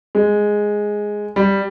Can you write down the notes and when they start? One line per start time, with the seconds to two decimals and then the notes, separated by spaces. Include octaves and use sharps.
0.15 G#3
1.36 G3